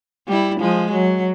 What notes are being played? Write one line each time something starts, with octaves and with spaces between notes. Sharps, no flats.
G3 E4
F3 G#3
F#3